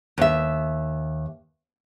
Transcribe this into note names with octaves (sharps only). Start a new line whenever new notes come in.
D#2 E5